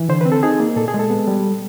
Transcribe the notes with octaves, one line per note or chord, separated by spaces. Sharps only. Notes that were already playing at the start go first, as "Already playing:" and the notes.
Already playing: E3
D3 C5
B4
C4
A4
D#4 G#4
A#3
A#2 A4
G#4
G#3
A4
B3
G3